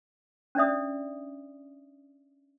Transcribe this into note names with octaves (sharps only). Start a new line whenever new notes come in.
C#4 D4 D5 E5 D#6